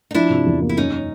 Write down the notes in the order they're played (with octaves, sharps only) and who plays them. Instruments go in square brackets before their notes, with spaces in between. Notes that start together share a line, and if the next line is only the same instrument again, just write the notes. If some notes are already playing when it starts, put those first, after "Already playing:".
[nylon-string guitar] D#4
[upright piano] F3 [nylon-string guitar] D4 E4
[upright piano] C3
E2
A#3
[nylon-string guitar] E4
[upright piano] F#2 [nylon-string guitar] C#4 D#4